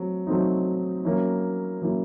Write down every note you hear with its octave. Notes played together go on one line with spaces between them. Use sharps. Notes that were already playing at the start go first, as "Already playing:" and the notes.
Already playing: F#3 A3 C4
F#3 A3 C4 D#4
F#3 A#3 C#4 E4
F#3 A#3 C#4 E4